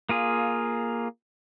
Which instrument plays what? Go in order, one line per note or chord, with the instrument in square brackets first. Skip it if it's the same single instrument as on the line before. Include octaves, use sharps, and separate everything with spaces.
[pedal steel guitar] A#3 F4 G#4